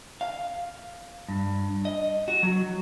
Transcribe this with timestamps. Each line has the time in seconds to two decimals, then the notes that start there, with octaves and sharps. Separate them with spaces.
0.21 F5
1.28 G2
1.85 D#5
2.28 F#4
2.43 F#3